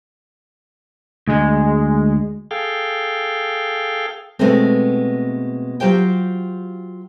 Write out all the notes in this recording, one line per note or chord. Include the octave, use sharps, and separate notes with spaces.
D2 G#3
G#4 A4 F5 G5
B2 G#3 A3 B3 C4
F#3 F4 G4 C5 G5